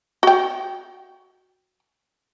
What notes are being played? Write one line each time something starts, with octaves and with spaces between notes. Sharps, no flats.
F#4 G5